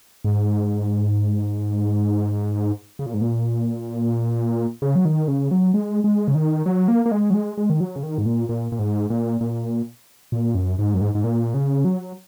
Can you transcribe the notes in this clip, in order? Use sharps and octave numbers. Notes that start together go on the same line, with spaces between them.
G#2
C#3
A#2
G#2
A#2
C#3
F#3
D#3
C#3
F#3
G#3
G#3
C#3
D#3
F#3
A#3
A#3
G#3
F#3
G#3
G#3
D#3
F#3
C#3
D#3
G#2
A#2
A#2
A#2
G#2
A#2
A#2
A#2
F#2
G#2
F#2
G#2
G#2
A#2
C#3
F#3